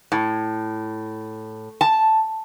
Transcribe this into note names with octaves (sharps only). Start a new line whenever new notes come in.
A2
A5